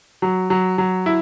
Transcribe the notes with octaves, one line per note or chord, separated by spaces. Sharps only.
F#3
F#3
F#3
E4